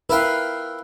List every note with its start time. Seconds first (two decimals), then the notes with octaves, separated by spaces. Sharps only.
0.10 E4 A#4 B4 F5 G5